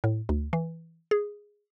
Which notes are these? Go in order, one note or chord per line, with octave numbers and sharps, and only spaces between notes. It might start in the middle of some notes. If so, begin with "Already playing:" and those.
A2
D2
E3
G#4